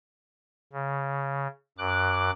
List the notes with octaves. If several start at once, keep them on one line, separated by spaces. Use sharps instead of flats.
C#3
F#2 D6 F#6